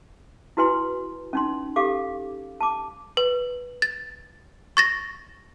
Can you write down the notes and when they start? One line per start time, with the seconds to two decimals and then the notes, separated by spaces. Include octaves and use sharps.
0.57 E4 F#4 B4 G#5 C6
1.33 C#4 D#4 C6
1.76 G4 A4 F5 D6
2.61 A5 D6
3.17 B4
3.82 A6
4.77 C#6 A6 A#6